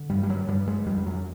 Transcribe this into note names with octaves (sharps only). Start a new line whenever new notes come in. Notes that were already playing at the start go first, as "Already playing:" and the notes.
Already playing: D3
G2 G3
G3
F#3
G2 G3
G#3
F2 G3
F#3